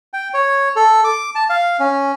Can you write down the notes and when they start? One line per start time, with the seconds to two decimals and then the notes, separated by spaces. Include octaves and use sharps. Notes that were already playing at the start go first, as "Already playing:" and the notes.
0.13 G5
0.34 C#5
0.76 A4
1.04 D6
1.35 A5
1.50 F5
1.80 C#4